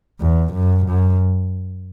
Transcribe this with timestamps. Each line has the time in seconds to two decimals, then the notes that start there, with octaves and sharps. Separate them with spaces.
0.20 E2
0.53 F#2
0.86 F#2